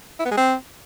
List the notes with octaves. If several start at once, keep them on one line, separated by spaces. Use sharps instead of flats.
E4
B3
G#3
C4